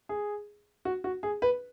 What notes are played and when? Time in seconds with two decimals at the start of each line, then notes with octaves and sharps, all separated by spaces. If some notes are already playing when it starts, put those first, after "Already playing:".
0.09 G#4
0.85 F#4
1.04 F#4
1.23 G#4
1.42 B4